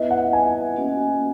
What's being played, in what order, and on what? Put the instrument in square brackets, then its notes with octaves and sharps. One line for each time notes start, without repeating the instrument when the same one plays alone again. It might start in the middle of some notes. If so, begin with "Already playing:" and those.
Already playing: [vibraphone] B3 E4 B4 E5 [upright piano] D#5
[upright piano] F#5
G#5
[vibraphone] A#3 C#4 F#4